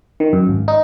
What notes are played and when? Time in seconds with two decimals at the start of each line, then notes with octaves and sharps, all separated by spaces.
0.20 D#3
0.33 F#2
0.49 G#1
0.68 D#4